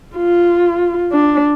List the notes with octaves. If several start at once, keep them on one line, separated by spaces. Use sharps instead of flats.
F4
D4